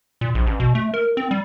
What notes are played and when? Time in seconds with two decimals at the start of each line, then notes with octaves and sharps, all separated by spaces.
0.21 A#2
0.35 A#1
0.47 A1
0.60 B2
0.75 A3
0.94 A#4
1.17 C4
1.31 G3